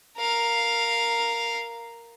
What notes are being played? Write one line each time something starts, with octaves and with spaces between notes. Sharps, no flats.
A#4 F5